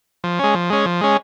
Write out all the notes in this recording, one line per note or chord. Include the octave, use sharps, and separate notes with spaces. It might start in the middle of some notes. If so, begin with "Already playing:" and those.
F3
G#3 C#4
F3
G#3 C#4
F3
G#3 C#4